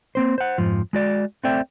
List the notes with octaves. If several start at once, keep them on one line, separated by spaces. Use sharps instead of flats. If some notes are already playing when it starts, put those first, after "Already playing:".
A#3 C4 C5
C5 F#5
F2 G#2 F3
G#3 F#4 D5
A3 C4 C5 D5 E5 G5